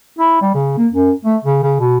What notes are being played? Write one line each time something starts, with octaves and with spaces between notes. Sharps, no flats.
E4
G3
C#3
A#3
F#2
A3
C#3
C#3
B2